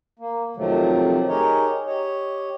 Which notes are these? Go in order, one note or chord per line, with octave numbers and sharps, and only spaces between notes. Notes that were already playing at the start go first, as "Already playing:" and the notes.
A#3
F2 C3 D#3 F3 F#3 A3
D#4 G4 G#4 A#4 C#5 D#5
G4 C#5 D#5